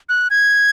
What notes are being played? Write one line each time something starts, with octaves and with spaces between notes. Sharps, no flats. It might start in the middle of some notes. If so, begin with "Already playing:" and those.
F#6
G#6